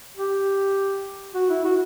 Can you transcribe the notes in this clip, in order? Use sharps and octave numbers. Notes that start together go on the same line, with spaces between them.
G4
F#4
E4
F#4